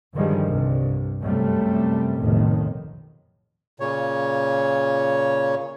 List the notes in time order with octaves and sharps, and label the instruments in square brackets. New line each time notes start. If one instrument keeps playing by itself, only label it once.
[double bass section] G2 D3 D#3 F3 G3 G#3
C2 G2
F#2 C3 G3 A3
F1 B1 A2 D#3
[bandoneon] A#2 C#3 C#5